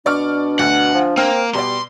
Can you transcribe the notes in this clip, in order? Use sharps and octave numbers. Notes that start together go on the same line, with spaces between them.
B2 D4 D5 C#6 F6
D2 F#5
F3
A#3 C4 F6
B2 G3 D5 C6